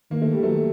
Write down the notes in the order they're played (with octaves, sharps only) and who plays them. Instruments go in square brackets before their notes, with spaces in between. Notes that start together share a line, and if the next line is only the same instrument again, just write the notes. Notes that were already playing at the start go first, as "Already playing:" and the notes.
[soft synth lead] D#3 [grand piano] A#3
[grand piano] A3
G3
F#3 A3